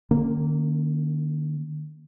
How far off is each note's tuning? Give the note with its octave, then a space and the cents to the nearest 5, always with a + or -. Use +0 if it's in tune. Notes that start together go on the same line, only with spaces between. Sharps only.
D#3 -45 A#3 -10 C#4 +0